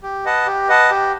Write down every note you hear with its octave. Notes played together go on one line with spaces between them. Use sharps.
G4
B4 D#5 F#5 A5
G4
B4 D#5 F#5 A5
G4